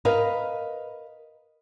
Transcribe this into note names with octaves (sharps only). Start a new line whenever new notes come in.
A#4 B4 D#5 F5